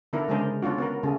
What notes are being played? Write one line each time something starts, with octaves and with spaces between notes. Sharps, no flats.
D3 B3 D4 E4 A#4
C#3 G#3 D4 G#4 A#4 C5
B3 C#4 D4 F4 F#4
B3 F#4 A#4
C#3 A3 C#4 G#4